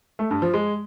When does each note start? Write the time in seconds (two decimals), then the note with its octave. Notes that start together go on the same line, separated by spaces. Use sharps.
0.19 A3
0.31 G2
0.42 F3
0.53 G#3